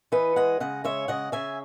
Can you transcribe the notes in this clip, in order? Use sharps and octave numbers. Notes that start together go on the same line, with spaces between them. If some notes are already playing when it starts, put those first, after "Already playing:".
E3 B4 D#5
G#3 D#5 F#5
C#3 D#5 F#5
G#3 C#5 E5
C#3 D#5 F#5
C#3 E5 G#5